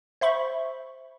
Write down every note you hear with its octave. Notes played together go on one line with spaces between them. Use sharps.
C5 E5 B5 C#6